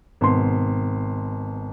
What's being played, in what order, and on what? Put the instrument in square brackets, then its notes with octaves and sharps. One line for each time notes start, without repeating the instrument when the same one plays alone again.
[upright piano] G#1 B2 C6